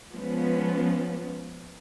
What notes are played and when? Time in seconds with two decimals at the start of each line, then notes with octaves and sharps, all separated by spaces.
0.12 F3 G#3 B3 C#4